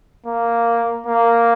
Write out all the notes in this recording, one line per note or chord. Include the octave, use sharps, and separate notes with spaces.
A#3
A#3